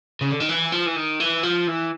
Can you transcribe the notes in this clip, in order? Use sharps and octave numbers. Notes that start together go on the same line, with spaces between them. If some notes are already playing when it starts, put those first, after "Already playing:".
C#3
D3
D#3
E3
F3
E3
D#3
E3
F3
E3